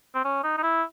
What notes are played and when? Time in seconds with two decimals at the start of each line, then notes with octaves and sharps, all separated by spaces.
0.15 C4
0.25 C#4
0.43 D#4
0.58 D#4
0.63 E4